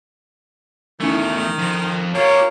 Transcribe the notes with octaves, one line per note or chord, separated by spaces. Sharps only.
E2 D#3 A3 C#4 D#4 E4
F2
A#3 F4 G4 C#5